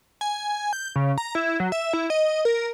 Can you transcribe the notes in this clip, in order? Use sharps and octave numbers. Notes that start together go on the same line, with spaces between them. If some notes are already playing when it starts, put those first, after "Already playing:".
G#5
G6
C#3
A#5
E4
F#3
E5
E4
D#5
A#4